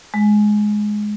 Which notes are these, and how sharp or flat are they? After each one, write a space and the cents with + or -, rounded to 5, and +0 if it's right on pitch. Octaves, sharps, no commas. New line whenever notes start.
G#3 +10